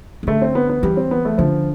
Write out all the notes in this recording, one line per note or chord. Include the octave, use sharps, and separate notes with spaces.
E3
D3 A3
C4
B3
B3
E3 G3
C4
B3
A3
D3 F3